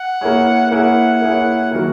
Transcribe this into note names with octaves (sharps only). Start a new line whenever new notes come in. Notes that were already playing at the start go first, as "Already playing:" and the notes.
Already playing: F#5
A#3 E4 G#4 C#5
A#3 E4 G#4 C#5 F#5
A#3 E4 G#4 C#5
D#3 F#3 A#3